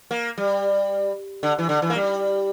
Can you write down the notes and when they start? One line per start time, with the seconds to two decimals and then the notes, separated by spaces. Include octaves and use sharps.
0.11 A#3
0.38 G3
1.43 D3
1.59 E3
1.69 D3
1.82 E3
1.90 A#3
1.96 G3